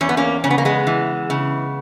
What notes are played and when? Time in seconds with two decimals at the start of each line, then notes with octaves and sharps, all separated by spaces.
0.01 E2 C#4
0.09 B3
0.17 A#3 C#4
0.44 C#3 C#4
0.51 B3
0.58 A#3
0.65 G#3 B3
0.87 E3
1.30 C#3